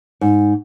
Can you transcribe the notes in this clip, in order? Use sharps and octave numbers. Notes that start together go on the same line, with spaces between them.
G#2